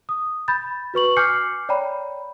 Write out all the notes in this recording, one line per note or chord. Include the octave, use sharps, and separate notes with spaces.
D#6
B5 G6 A6
F#4 B4 C#6 F#7
G#5 D6 F6 G6 C7 C#7
C#5 D5 G5 A#5 B5